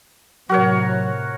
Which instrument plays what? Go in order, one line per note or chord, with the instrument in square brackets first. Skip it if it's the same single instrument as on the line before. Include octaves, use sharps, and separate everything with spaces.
[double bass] A2 C3 [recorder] F#3 [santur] F#4 A#4 C#5